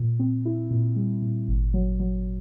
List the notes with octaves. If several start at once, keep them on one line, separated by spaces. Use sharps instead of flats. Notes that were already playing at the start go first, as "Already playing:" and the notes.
Already playing: A#2
C4
E4
A#2
G3
A#2
G#1
F#3
F#3